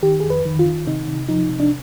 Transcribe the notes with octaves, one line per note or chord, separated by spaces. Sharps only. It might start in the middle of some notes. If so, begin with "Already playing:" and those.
D#3 G4
F2 G#4
B4
D#3
F4
D#3
C3 D#4
C3
F3 D#4
C3
D4